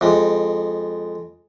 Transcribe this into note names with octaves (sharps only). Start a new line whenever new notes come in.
F2 G#3